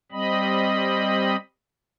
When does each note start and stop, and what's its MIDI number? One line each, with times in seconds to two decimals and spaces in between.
0.12 1.36 55
0.12 1.36 60
0.12 1.36 75
0.12 1.36 83